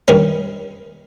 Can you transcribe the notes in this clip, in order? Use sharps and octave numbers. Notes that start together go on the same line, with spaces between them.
G2 D#3 G3 C#4